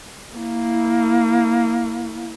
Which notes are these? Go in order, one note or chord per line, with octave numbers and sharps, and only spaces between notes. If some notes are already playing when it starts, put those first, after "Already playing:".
A#3 E4